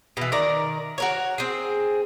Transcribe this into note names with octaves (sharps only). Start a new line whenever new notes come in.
B2 E3
D#3 A#4 D5 A#5
F#4 A#4 C#5
C4 G#4